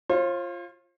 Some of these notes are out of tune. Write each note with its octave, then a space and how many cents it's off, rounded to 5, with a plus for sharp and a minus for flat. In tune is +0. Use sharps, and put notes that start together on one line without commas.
F4 -5 C5 +45